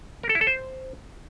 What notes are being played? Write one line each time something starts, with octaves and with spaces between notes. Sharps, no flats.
A#4
A4
E4
A4
C5